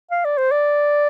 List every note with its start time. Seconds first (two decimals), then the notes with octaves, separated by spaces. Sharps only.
0.11 F5
0.25 D5
0.38 C5
0.52 D5